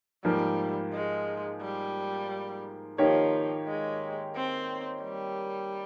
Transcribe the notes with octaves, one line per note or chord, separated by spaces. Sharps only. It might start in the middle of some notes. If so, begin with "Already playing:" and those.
G#2 F3 G3 A#3
G#3
G3
D#3 F3 A#3 D#4 G4 C#5
G#3
C4
G3